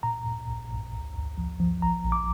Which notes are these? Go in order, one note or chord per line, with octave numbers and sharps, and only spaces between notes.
A#2 A#5
A#2
A#1
A#1
D2
D2
F3
F3
A#1 A#5
A#1
D6